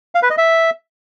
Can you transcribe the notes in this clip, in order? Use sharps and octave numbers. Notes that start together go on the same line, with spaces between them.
F5
B4
D#5
E5